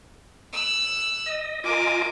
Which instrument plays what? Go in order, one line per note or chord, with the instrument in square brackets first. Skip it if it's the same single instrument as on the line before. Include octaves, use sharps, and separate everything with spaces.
[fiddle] E6 F#6
[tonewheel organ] D#5
[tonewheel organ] F4 D#5 G#5 [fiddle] A#4 D6